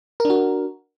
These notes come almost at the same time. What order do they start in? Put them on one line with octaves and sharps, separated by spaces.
A#4 D4 F#4